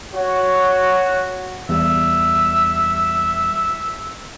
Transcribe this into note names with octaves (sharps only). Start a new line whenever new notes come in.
F#4 C#5
E2 G3 E5